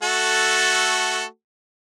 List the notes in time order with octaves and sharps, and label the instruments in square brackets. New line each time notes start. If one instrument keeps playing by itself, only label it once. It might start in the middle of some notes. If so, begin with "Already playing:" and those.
[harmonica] A3 F#4 A4